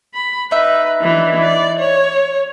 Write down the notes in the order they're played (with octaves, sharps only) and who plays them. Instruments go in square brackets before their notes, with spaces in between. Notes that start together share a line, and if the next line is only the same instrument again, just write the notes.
[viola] B5
[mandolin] D#4 E5 [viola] B4
[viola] E3 D4
D5
C#5